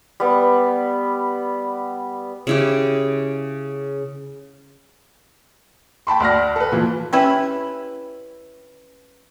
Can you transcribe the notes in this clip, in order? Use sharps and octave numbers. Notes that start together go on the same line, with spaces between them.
G3 B3
C#3 E4 G4
G5 A5 B5 C6
D2 D5 F6 A#6
A4 B4
A#2 E3 F3
C#4 E4 G4 B4